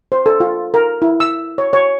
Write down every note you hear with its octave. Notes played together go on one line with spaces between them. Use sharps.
C5
A4
F4
A#4
E4
E6
C#5
C#5